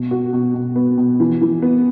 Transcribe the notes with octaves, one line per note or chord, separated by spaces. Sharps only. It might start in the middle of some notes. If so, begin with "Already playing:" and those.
Already playing: B2
F#4
B2
B2
B3
B2
E3
E3
B3